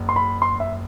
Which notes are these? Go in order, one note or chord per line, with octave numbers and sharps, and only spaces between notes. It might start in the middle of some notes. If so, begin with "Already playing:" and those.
Already playing: F#1
C6
B5
C6
E5